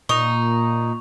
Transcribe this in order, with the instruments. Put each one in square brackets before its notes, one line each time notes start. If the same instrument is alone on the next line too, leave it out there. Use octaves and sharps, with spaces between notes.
[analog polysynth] A#2 [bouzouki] D#4 [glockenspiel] C#6 F7